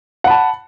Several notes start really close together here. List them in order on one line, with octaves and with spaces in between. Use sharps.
F#5 B5 A5